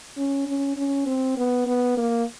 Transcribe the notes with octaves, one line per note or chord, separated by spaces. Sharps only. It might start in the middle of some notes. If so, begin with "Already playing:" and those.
C#4
C#4
C#4
C4
B3
B3
A#3